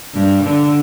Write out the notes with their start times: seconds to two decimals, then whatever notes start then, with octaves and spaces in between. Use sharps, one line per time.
0.13 G2
0.43 D3